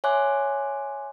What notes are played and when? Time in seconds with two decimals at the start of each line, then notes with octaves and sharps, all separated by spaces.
0.04 C#5 E5 G#5 C6 D6 F#6